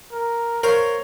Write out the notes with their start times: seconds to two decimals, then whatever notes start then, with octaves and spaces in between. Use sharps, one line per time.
0.13 A#4
0.63 A#4 C5 C#5 F5